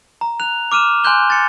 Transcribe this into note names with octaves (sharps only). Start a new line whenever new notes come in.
A#5
F#6 F7
D6 F6 D#7 E7
G#5 C6 F#6 G6 G7
A6 C#7